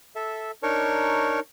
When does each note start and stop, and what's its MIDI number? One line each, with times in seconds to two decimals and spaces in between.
0.16 0.51 69
0.16 0.51 76
0.63 1.40 62
0.63 1.40 63
0.63 1.40 70
0.63 1.40 73
0.63 1.40 85